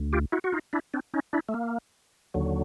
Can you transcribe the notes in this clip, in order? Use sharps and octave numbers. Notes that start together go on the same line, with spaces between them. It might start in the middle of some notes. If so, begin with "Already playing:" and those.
Already playing: D2
F4 G4
E4 F#4
F#4
D#4 F4
D4 E4
C4 D4
C#4 D#4
D4 E4
A3
A#3
D#2 D3 F#3